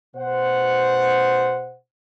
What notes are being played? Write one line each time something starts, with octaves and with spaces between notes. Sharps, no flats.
B2 C5 F#5